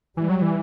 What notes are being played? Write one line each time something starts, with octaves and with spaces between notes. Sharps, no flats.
E3 G3
F#3
E3